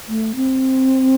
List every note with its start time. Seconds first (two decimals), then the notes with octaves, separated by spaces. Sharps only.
0.08 A3
0.35 C4